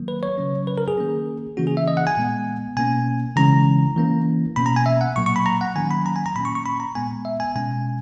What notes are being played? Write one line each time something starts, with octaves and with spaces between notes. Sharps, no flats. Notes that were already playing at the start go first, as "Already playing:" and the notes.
Already playing: D#3 F#3 A#3
B4
C#5
C#3 F#3 C#4
B4
A#4
G#4
D#3 A#3 C#4
C#3 E3 A#3 C#4 F#4
G#4
E5
D#5
F#5
G#5
A#2 G#3 B3
B2 A#3 C#4 G#5
C#3 E3 G#3 C#4 A#5
E3 A#3 C#4
B2 A#3 C#4 B5
A#5
G#5
E5
F#5
A#2 F#3 A#3 C#6
C#6
B5
A#5
F#5
D#3 F#3 A#3 C#4 G#5
B5
A#5
G#5
A#5
A#2 A#3 C#4 B5
C#6
C#6
B5
A#5
A#2 G#3 B3 G#5
E5
G#5
B2 G#3 C#4 G#5